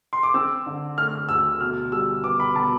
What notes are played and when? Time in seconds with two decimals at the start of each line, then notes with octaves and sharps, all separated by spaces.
0.13 C6
0.23 D6
0.34 C4 E6
0.66 D3
0.98 A3 F6
1.29 D2 E6
1.61 B2 F6
1.92 G3 E6
2.24 B3 D6
2.40 B5
2.56 B2 A5